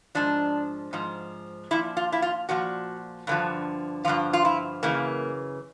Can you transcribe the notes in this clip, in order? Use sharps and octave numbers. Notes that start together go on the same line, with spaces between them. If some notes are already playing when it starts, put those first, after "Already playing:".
G#2 F3 D4
G#2 F3
A#2 F3 E4
F4
E4
F4
A#2 F3 F#4
G2 D3 F3
G2 D3 F3 F4
F4
E4
F#2 C#3 E3 A#3